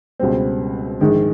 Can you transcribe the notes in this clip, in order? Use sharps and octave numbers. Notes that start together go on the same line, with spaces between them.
C#2 B2 G3 C4
A#1 G#2 D#3 G#3